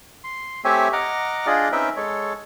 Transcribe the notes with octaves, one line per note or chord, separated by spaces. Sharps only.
C6
A3 C4 G4 C#5 E5 G#5
D#5 F#5 A#5 D6 F6
D4 F4 G#4 D5 D#5
C4 C#4 D#4 B4 E5 G5
G#3 A4 C#5